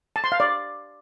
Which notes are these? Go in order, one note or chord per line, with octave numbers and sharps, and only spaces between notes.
A5
C6
F5
D5